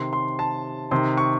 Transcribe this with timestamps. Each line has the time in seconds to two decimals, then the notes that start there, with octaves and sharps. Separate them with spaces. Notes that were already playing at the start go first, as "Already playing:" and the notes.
Already playing: C3 D#3 C6
0.13 C6
0.39 A5
0.91 C3 D#3 C6
1.18 C#6